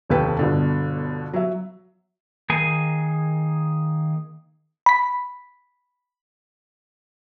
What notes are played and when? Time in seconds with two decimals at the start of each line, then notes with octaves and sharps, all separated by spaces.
0.10 F1 D#2 A4 B4 G5
0.39 G1 B2 D3
1.33 F#3 E5
2.50 D#3 A#3 G#4 G#5
4.86 B5 B6